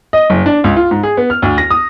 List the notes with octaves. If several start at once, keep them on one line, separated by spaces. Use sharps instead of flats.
D#5
F#1
D4
C#2
F4
G#2
G#4
B3
F6
D2
A#6
D#6